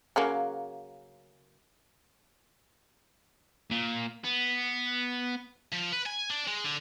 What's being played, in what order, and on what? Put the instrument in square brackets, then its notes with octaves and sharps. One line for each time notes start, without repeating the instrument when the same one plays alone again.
[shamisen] C#3 F#3 A#3
[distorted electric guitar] A#2
B3
F3
B4
G#5
D4
G#3
D3